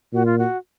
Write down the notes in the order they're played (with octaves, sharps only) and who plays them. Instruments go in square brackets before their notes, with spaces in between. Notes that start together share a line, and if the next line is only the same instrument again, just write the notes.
[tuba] A#2 [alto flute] F#4
[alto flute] F4
F#4